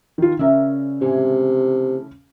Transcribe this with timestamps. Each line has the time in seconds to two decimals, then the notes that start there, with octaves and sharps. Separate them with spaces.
0.18 D#3 F4
0.39 C#3 C#4 A#4 D5 E5
1.01 A2 C3 E3 G#3